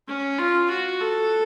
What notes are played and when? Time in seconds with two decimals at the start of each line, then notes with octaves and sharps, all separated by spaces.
0.08 C#4
0.39 F4
0.70 F#4
1.00 A4